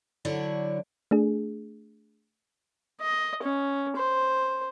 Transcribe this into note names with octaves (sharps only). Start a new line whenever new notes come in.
D3 F#3 D4 E4 C#5
A3 D4 G#4
D#5
C#4
C5